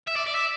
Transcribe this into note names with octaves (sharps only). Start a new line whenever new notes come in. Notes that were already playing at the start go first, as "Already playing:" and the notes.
E5
D5
D5
E5